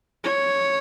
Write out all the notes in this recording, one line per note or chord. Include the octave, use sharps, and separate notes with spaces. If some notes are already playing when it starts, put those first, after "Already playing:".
C#5